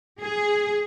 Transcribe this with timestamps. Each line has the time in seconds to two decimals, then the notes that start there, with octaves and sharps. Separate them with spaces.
0.20 G#4